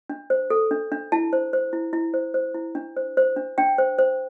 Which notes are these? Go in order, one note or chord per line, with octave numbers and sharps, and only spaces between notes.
D4
C5
A4
D4
D4
E4 A5
C5
C5
E4
E4
C5
C5
E4
D4
C5
C5
D4
D4 G5
C5
C5